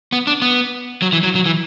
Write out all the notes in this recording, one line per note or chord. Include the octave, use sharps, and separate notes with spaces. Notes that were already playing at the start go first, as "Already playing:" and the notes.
B3
D4
B3
F#3
E3
F#3
F#3
E3